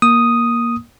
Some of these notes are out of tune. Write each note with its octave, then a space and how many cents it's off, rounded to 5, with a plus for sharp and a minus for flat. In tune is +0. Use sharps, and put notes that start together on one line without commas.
A#3 +10 D#6 +0